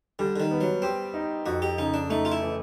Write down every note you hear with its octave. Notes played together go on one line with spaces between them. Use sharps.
D3 G3
D3
D#3
B3
F#3
C4 G4
D#4
F2 F#4
G4
C#3 D#4
D4
A3 D#4
F4
E4
E3